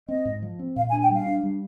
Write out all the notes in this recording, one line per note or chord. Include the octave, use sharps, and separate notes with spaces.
C4 D#5
G#2
F3
C4
A#2 F5
G#5
D4
G5
G3 F5
D4
G3